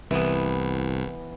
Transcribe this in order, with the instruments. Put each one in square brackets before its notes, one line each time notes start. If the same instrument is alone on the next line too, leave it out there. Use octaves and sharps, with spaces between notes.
[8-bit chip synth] C2 [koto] E3 B3